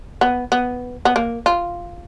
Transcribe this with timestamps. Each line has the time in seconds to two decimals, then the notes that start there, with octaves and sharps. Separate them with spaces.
0.21 B3
0.52 B3
1.05 B3
1.16 A#3
1.46 F4